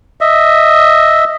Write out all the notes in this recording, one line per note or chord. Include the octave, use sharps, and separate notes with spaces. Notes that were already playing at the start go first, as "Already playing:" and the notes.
D#5 E5